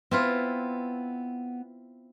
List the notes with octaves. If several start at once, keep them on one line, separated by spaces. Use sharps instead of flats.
B3 C4 E4 F4